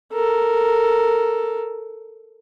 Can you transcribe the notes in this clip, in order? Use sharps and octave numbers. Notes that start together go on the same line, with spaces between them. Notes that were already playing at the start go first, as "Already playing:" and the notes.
A4 A#4